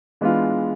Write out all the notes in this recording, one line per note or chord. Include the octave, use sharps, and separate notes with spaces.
E3 G#3 B3 D4 F4